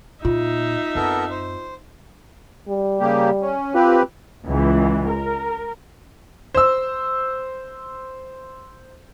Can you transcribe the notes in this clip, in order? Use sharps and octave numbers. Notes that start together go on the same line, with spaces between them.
A#2 D#4 F4 E5
F#2 B3 C4 A4 A#4
C5
G3
C#3 A#3 G4
C#4
C4 F4 G4 B4
C#2 E3
A#4
C5 E6